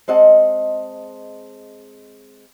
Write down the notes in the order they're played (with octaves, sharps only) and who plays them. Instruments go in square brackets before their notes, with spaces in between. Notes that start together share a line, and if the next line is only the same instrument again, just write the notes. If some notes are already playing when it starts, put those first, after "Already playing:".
[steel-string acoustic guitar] G#3 C4 D#5 F#5 A5